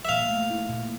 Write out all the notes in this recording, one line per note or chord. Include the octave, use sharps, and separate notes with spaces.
E5
A#2 F5
A3
E4
A#2